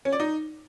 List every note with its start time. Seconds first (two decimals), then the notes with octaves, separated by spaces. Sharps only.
0.05 C#4
0.12 D5
0.20 D#4